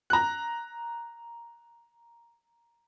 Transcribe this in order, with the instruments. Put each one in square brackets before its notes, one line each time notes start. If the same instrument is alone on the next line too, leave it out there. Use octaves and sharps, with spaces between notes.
[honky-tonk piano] A#5 F#6